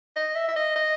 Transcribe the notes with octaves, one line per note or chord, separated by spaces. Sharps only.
D#5
E5
E5
D#5
D#5